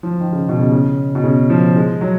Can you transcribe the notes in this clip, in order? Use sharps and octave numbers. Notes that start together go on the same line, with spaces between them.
F3
D#3
C#3
B2
C#3
C#3
B2
C#3
F3
G#3
F#3